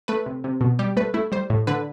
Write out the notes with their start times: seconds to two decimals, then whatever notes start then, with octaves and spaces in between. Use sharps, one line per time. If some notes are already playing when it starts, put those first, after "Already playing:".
0.08 A3 B4
0.26 C3
0.44 C3
0.61 B2
0.79 G3 G4
0.97 A3 B4
1.14 A3 E4
1.32 G3 C5
1.50 A2
1.67 D3 B4